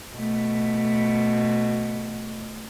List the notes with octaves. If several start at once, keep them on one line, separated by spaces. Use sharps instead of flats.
B2 A3